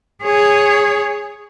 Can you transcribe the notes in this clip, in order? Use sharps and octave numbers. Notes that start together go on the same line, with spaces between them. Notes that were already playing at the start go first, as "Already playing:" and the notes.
G#4 C#5